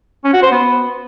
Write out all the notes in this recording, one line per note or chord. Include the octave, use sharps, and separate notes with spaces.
C#4
F#4
C5
B3